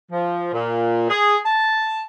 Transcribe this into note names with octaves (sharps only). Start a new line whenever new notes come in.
F3
A#2
G#4
A5